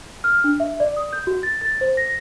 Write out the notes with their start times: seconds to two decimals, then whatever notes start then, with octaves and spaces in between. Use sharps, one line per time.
0.24 F6
0.44 D4
0.60 E5
0.80 D5
0.97 D#6
1.13 G6
1.27 F#4
1.43 A6
1.61 A6
1.81 C5
1.97 A#6